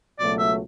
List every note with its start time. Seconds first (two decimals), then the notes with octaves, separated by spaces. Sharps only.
0.19 C#2 B2 F#3 A3 D5
0.39 E5